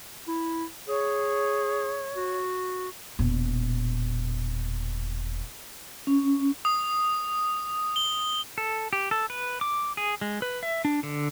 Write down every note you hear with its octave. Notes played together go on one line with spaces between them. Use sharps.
E4
G#4 C#5
F#4
E1 A#2
C#4
D#6
G7
A4
G4
A4
B4
D6
G#4
G#3
B4
E5
D4
D3